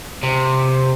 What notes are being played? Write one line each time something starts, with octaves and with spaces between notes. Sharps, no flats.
C3